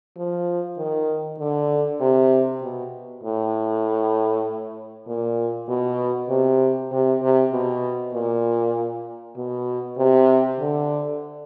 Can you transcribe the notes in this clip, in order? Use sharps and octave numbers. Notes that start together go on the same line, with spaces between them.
F3
D#3
D3
C3
B2
A2
A#2
B2
C3
C3
C3
B2
A#2
B2
C3
D3